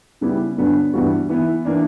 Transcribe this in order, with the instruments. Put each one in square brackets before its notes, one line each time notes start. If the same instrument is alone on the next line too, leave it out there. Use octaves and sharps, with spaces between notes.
[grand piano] C#3 G3 B3 E4 G4
G2 D3 F#3 B3 D4
G2 E3 G3 B3 F#4
E3 B3 E4
E3 A#3 D4